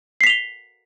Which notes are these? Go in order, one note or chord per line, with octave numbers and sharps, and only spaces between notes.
B6 C7 F7 G7